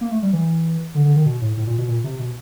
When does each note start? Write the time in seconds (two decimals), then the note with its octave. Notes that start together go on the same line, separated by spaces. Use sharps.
0.01 A#3
0.11 A3
0.23 G3
0.33 E3
0.95 D3
1.05 D3
1.16 D#3
1.26 B2
1.41 A2
1.57 A2
1.67 A#2
1.78 B2
1.88 A#2
2.04 C3
2.19 B2